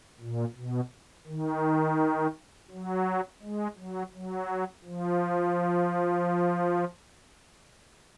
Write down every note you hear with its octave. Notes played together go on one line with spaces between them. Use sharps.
A#2
B2
D#3
F#3
G#3
F#3
F#3
F3